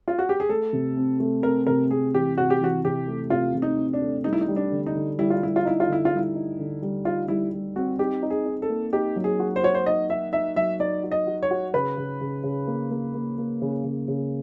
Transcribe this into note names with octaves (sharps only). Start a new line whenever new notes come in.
F4
F#4
G4
G#4
A3 A4
C3
C4
A3
C4 A#4
C3 A#4
C4 G#4
E3 G4
C3 F#4
G4
E3 F#4
C3 G4
A3
C3 F4
C3
D#4
C4
D4
A3
G3 D#4
E4
D#4
G3
D4
D3
D#4
D3
G3 E4
F4
G3 E4
F4
D#4 E4
F4
D3 E4
F4
G3 E4
D#4
D3
G3
D#4 F4
G3 E4
G3
C4 F#4
D#4 G4
D#4
G#4
D#4
A4
A#3
D#4 G4
F#3
G#4
F#4
C5
F#4 C#5
C5
D#4 D#5
D#4 E5
D#4 E5
F#3 E5
D#4 D5
F#4
D#5
F#4
C#5
F#4
C#3 B4
C#3
C#3
C#3
A#3
A#3
A#3
A#3
C#3
C#3
C#3